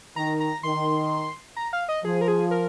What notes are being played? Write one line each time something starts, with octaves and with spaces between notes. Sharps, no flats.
D#3 A#5
A#5
D#3 C6
A#5
F5
D#5
F3 G#4
A#4
G#4
A#4